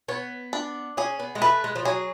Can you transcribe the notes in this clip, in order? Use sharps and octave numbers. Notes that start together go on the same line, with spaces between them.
B3 C#5
D4
C#4 G#4
B3
G#3
A3 B4
G#3
F3
F#3 G#4